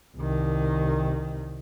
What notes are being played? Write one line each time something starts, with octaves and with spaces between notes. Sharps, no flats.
C2 D#3